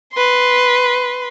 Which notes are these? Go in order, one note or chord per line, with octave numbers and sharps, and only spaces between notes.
B4 C6